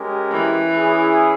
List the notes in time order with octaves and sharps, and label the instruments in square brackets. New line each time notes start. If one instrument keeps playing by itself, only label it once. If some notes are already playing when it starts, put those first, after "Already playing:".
Already playing: [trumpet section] G#3 C#4 G4 A#4
[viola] E3
[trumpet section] C#4 E4 G#4